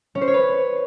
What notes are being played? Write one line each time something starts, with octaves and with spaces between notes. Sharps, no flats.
C#4
C5
C#5
B4